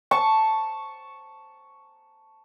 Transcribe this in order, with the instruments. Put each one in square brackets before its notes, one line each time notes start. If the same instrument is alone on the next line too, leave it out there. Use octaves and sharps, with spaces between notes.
[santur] A5 C#6